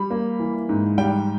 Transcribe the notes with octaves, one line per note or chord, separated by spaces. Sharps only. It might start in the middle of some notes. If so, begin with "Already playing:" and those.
Already playing: G3 B5
A#3
E3
G#2
G3 G5